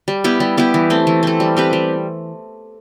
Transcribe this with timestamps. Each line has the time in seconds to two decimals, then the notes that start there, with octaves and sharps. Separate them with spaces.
0.08 G3
0.24 B3 E4 G4
0.40 G3
0.57 B3 E4 G4
0.74 E3
0.90 A3 C4
1.07 E3
1.23 A3 C4
1.40 G3
1.57 C4 G4 B4
1.73 G3